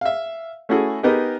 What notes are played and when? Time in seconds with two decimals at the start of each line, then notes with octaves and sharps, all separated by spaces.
0.01 E5 F5
0.69 A3 C#4 E4 F#4 G#4 A4
1.03 B3 D#4 G4 G#4 A#4 D#5